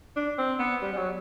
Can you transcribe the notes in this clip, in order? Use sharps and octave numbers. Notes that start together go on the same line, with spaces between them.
D4
C4
B3
G3
G3
F#3